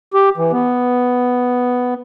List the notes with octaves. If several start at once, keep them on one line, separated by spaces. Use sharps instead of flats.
G4
E3
B3